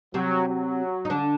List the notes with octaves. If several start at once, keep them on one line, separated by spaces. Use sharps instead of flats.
C3 F#3 C4
F#3
D#4
D3 D4